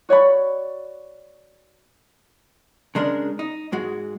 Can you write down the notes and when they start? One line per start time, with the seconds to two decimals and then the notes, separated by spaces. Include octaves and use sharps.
0.09 F#4 C#5 D5 B5
2.95 C#3 G#3 D4 A#4
3.39 D#4
3.72 G#2 G#3 F#4